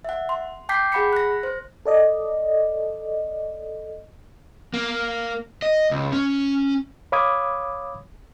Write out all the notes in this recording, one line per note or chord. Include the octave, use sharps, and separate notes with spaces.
E5 F#5
C6
G5 A5 D6 G6 B6 C7
G#4 F#5 B5 B6 C#7
F#6 A#6
C5
A4 D5 D#5
A#3
D#5
C#2
C#4
C#5 F5 B5 D6 D#6 G#6